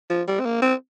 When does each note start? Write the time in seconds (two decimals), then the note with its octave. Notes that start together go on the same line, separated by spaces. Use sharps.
0.10 F3
0.28 G3
0.40 C4
0.45 A#3
0.62 C4